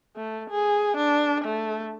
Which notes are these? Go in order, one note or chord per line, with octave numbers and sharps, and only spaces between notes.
A3
G#4
D4
A3